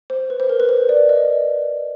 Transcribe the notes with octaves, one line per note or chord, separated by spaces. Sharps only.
C5
B4
C5
A#4
B4
C5
D5
D#5